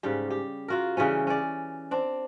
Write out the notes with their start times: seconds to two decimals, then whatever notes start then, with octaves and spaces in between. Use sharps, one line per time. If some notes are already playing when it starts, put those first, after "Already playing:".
0.03 G#2 C#3 G3 G4
0.31 G4
0.68 F4 F#4 A#4
0.97 C#3 E3 G3 C#4
1.27 C#4 D5
1.91 C4 D4